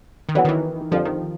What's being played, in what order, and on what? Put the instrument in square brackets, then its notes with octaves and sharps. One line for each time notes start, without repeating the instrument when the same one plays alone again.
[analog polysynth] D#3
[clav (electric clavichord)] D3 F#3 B3 [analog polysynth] E3
[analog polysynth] D#3
E3
[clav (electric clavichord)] F2 D3 G3 [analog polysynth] F3
[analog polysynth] D#3